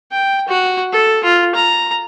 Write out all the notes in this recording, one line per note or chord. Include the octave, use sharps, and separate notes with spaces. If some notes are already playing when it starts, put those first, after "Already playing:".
G5
F#4
A4
F4
A#5